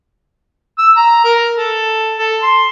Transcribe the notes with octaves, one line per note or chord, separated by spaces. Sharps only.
E6
A#5
A#4
A4
A4
C6